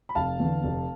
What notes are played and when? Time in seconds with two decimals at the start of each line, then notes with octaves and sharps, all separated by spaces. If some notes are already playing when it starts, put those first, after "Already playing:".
0.09 B5
0.15 F1 F5 A5
0.40 E2 D3
0.64 F1